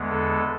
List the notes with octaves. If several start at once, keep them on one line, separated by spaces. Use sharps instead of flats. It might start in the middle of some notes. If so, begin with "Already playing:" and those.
Already playing: E2 D3 G#3 B3
A4